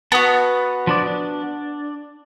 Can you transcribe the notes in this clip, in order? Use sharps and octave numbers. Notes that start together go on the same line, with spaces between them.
B3 F#4 A5 D#6
F3 D4 D5
D4